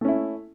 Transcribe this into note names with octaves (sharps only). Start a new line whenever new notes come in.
A3 C#4 E4